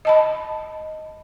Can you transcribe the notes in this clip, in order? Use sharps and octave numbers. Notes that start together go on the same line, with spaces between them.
D#5 A5 B5